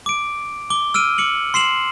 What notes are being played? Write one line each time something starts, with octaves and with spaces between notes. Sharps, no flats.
D6 D7
D6 G7
E6 F6 D7 D#7
D6 C#7 F#7
C6 C7 E7 F#7